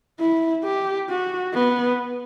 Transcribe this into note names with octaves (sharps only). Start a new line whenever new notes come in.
E4
G4
F#4
B3